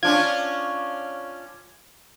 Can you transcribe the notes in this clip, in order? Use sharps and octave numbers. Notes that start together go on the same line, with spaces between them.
C#4 D4 F4 G#6